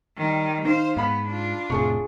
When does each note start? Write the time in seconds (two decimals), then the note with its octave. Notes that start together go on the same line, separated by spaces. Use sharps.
0.17 D#3 G3
0.65 D#3 C5 F5
0.97 G#2 B3 F5 B5 B6
1.27 D4 F4
1.70 F1 A2 C3 G#4 A5 C#6